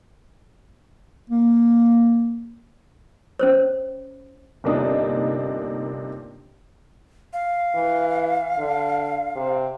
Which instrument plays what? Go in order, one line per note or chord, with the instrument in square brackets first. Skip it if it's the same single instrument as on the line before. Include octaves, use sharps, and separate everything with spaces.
[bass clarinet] A#3
[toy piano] C#4 C5 C#5
[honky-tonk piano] G1 C3 A#3 D4 D#4 D#6
[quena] F5
[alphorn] E3
D3
C3